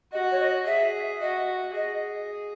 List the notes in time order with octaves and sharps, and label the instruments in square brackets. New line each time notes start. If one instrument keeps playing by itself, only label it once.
[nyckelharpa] F#4 [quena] D#5
[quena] C#5
D#5
[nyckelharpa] G#4 [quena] E5
[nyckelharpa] F#4 [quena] D#5
[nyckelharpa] G#4 [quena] D#5